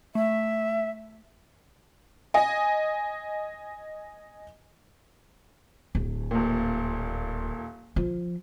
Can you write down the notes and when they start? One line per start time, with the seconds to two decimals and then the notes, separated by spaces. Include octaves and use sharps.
0.15 A3 E5
2.34 D#5 G#5
5.95 D1
6.31 D#1 A#2
7.96 F3